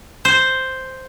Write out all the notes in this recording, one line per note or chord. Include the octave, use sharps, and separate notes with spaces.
C5